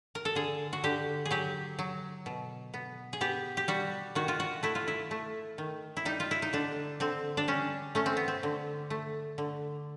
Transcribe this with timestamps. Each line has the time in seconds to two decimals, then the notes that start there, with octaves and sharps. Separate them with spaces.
0.15 A#4
0.25 A4
0.35 D3 G#4
0.73 F#4
0.84 D3 G4
1.25 G#4
1.31 F#3 G4
1.79 F#3
2.26 B2
2.74 B3
3.13 G#4
3.21 B3 G4
3.57 G4
3.68 G3 F#4
4.15 D#3 F#4
4.28 F4
4.40 F#4
4.63 A3 E4
4.75 F4
4.88 E4
5.11 A3
5.58 D#3
5.97 E4
6.05 G3 D#4
6.20 F4
6.31 E4
6.42 D#4
6.53 D3 D4
7.00 D3 C4
7.37 D4
7.48 G3 C#4
7.95 A3 C#4
8.06 C4
8.17 B3
8.28 C4
8.43 D3
8.90 A3
9.38 D3